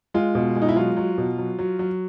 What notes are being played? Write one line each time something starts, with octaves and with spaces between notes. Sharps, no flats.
G#3 F4
B2
G#3
D#4
E4
F#3 F4
F#3
B2
F#3
F#3
F#3